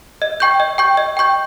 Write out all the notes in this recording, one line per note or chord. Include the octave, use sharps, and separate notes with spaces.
D#5
G5 C#6 G6
D#5
G5 C#6 G6
D#5
G5 C#6 G6